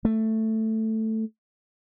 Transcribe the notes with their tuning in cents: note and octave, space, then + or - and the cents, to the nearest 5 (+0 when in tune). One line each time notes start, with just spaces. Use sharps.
A3 +5